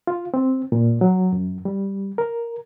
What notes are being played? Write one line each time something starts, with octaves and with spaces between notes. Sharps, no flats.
F4
C4
A#2
F#3
F#2
G3
A#4